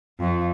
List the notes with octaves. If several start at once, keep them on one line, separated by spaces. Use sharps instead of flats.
F2